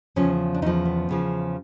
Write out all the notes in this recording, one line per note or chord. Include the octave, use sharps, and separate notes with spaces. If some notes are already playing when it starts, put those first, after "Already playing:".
E2 C#3 F3 C#4
D4
E2 C#3 F3 D#4
B3
E2 C#3 F3